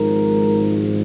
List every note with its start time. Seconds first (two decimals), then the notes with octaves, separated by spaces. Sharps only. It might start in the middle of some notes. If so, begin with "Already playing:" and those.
Already playing: G#1 G#2 F3 A#4